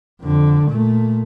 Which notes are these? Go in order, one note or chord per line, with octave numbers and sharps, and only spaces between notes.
F2 D3
A#2 A3